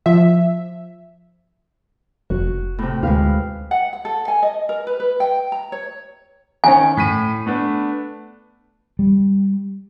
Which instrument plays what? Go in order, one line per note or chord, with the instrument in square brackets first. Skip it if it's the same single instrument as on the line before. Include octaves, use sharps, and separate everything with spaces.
[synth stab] F3 E5
[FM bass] F1 [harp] F#4
[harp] A2 C3
[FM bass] D2 [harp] G#3 B4 F5
[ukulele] F#5
F#5
A4
G#5
D#5
A#4
B4
B4
G5
A#5
C#5
[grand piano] D#3 C#4 [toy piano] G#5
[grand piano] A2 B6 D#7
A3 B3 D4
[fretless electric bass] G3